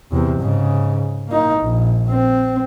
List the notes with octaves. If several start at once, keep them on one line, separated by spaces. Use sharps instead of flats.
E2 C3
G#2 C#3
A#3 D#4
A#1
C4